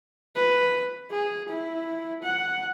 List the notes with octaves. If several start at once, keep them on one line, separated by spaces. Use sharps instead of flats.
B4
G#4
E4
F#5